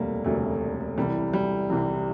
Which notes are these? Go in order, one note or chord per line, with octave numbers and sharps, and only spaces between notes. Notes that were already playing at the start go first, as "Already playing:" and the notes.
Already playing: E1 D2 C3 G3 A3 A#3
E1 D2 C3 A3
C2 C3 E3 G3
G3
C2 C3 E3